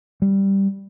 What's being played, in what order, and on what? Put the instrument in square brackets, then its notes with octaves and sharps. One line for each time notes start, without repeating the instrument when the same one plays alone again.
[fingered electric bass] G3